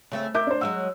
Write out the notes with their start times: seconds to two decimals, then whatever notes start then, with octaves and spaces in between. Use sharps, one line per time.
0.12 C#3 A3 C4
0.34 A#4 E5 D6 G6
0.47 D4 C5
0.61 F#3 G#3 F#4 E6